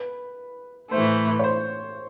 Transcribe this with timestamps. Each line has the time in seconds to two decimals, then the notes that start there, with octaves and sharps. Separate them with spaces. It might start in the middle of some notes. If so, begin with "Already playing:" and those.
Already playing: B4
0.91 A2 E3 A3 C5
1.39 C#5
1.44 C5